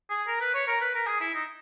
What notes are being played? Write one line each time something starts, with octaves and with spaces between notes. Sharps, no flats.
G#4
A#4
B4
C#5
A#4
B4
A#4
G#4
E4
D#4